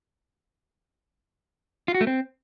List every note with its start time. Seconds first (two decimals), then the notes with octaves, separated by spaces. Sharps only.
1.88 F4
1.94 F#4
2.01 A3
2.07 C4